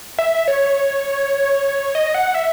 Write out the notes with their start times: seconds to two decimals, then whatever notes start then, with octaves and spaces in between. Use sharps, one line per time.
0.19 E5
0.48 C#5
1.95 D#5
2.15 F#5
2.34 E5